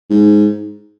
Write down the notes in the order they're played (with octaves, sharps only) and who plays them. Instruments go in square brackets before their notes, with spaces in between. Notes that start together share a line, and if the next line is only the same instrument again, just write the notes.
[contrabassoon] G#2